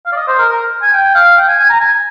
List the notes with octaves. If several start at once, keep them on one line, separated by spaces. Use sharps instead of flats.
F5
D5
D#5
C5
A#4
A#4
G#5
G5
F5
G5
G#5
G#5
A#5
G#5